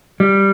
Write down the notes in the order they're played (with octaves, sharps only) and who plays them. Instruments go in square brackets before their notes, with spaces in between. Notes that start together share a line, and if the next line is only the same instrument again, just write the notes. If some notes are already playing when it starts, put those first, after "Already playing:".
[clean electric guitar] G3